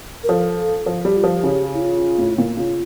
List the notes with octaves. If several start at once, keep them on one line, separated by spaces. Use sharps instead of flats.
A#4
F3 A4
F3
G3 G4
F4
F3 G4
C#3
E4
F4
A2
A#2
C#3 F4